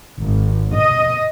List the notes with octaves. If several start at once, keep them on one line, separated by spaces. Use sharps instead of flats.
G#1
D#5